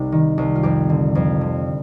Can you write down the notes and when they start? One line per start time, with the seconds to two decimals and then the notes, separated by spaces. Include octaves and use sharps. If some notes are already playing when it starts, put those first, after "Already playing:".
Already playing: C2 C3 D#4
0.12 D#3
0.38 C2
0.55 F4
0.63 F2 G4
0.90 D3
1.15 F2
1.41 D3